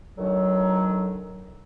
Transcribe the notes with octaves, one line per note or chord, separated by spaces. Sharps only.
D2 D3 D#3 F#3